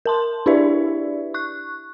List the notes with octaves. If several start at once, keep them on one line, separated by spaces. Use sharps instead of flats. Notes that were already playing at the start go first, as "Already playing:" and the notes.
A#4 A5 C6
D4 E4 G4 B4 D5 E5
C#6 F#6